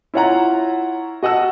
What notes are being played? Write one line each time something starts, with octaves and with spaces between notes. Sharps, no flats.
E4 F4 C#5 E5 F#5 A#5
F#4 D#5 F#5 A5 E6